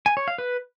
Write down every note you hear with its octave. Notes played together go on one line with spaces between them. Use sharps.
G#5
C#5
F5
B4